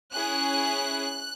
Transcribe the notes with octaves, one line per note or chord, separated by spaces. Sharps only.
C#4 E4 G#4 F#6